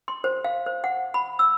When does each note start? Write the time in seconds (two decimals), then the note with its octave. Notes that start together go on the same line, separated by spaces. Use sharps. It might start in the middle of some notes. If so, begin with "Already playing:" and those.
0.08 C6
0.24 C5
0.44 F5
0.66 C5
0.84 F#5
1.14 B5
1.39 E6